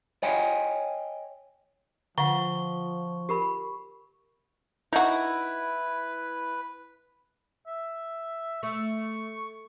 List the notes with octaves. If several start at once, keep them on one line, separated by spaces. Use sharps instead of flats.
C#5 D#5 G5 G#5
D3 F3 F5 F#5 C#6
G4 A#4 B5
D#4 E4 F#4 B4
E5
A3 C#6